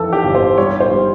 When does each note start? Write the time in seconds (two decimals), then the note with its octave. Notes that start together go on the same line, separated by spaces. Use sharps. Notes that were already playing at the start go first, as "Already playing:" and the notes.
Already playing: F2 E3 A4
0.13 G4
0.23 G1
0.35 C5
0.58 G3 C#5
0.80 C5
0.91 G3